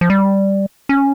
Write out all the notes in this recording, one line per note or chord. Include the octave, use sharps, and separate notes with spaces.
F3
G3
C#4